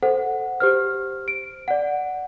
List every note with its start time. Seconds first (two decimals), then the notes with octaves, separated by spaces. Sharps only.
0.03 A4 C5 F#5
0.60 G4 C5 F6
1.28 D7
1.68 D5 F#5